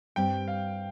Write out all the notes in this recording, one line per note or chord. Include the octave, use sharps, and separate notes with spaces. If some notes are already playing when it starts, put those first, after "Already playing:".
G2 G3 C4 G4 G5
F5